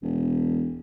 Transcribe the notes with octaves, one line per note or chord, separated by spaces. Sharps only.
E1